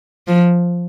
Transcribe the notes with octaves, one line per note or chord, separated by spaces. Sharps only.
F3